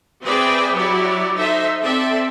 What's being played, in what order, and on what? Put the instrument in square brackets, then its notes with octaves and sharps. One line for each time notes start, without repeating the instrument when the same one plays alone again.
[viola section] C4 G#4 B4 D5 E5 G5
F#3 E4 G4 D5
D#4 A4 C5 E5
C4 A4 D5 E5